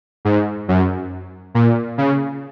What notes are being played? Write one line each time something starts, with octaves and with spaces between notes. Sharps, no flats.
G#2
F#2
A#2
C#3